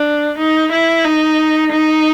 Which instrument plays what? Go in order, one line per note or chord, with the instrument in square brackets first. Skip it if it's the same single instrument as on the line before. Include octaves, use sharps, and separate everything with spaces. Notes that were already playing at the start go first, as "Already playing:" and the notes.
Already playing: [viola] D4
D#4
E4
D#4
D#4